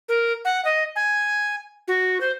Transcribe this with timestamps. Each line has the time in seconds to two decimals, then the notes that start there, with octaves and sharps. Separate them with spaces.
0.09 A#4
0.45 F#5
0.65 D#5
0.96 G#5
1.88 F#4
2.21 C5